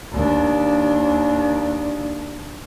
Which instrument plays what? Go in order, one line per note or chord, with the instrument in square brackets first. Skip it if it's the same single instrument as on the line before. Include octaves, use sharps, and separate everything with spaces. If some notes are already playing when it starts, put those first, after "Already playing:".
[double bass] D#2 D4